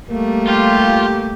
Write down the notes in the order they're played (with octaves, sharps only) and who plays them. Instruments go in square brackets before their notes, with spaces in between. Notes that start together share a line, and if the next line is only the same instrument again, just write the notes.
[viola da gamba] G3 A3 [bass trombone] A#3
[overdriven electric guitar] F4 [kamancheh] G4